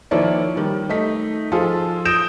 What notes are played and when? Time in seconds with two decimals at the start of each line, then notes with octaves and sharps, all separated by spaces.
0.11 D#3 F3 A#3 E4 C#5 D5
0.56 D#3 G3
0.89 A3 D#4 B6
1.52 F3 F4 G#4 A4
2.05 D#6 G6 A#6 D7 E7